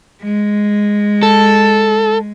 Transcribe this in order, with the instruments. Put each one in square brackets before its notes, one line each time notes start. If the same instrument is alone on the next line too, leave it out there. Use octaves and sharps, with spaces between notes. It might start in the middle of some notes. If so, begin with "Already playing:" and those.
[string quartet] G#3
[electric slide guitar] A4